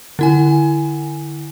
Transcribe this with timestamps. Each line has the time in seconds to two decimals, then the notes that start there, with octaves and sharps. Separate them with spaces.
0.19 D3 E4 G#5